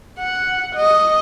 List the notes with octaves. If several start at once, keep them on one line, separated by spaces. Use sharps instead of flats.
F#5
D#5